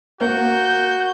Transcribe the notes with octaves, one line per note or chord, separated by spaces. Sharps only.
A#3 F#4 G6